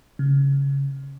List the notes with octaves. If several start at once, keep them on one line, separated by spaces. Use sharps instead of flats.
C#3